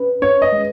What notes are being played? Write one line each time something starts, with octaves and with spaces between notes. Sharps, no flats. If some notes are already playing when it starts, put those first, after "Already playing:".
Already playing: C#4 B4
C#4 C#5
D#5
G#3